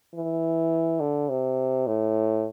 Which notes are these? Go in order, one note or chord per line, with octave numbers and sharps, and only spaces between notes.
E3
D3
C3
A2